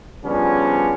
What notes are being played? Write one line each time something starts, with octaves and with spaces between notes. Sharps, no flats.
C#3 F3 G3 B3 C#4 D4